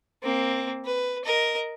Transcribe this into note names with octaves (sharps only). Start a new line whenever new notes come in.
A#3 C4
B4
A#4 D#5